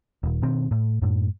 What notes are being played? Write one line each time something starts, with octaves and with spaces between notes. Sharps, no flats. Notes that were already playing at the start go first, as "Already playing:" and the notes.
D#1
B2 D#3 C4
A2
F#2 A2